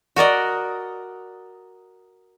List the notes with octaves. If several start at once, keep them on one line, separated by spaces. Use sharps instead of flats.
F#4 A#4 D5 D#5